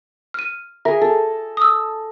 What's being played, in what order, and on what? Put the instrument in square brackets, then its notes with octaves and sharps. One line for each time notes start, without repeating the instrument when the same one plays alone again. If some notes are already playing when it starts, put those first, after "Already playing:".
[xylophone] F6 D#7
[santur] G#4 A#4 [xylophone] E5
[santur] A4
[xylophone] D#6 E6